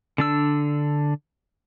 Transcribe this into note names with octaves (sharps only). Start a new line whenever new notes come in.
D3 D4 E6